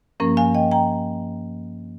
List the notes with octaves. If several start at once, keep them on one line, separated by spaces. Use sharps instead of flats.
G2 F3 A#3 C#4 A#4
F5 G#5
D#5 G5
G5 A#5